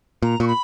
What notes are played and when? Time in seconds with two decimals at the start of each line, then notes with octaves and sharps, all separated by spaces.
0.22 A#2 A#5
0.40 A#2 C#6
0.47 B5